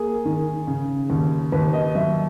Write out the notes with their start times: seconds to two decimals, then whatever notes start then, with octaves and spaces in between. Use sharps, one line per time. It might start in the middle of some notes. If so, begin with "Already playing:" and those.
Already playing: A#3 G#4
0.25 D#3
0.67 C#3
1.10 D#2
1.52 D#2 B4
1.73 D#5
1.95 F#3 E5